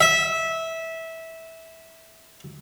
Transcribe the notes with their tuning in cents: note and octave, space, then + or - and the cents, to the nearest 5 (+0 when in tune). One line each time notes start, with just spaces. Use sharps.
E5 -15